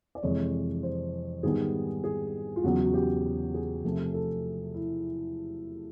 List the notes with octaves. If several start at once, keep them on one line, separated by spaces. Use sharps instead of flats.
D5
F2 C3 E3 G#3 C#5
C5
G#2 D#3 G3 B3 G#4
G#4
F4
E2 C#3 F#3 B3 F#4
F#4
G4
G#4
C3 F3 A3
A4
E4